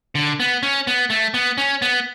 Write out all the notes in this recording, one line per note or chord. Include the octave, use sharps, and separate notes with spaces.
D3
B3
C#4
B3
A3
B3
C#4
B3